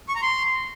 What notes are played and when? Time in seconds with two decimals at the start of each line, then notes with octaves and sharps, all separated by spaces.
0.09 C#6
0.15 A#5
0.22 C6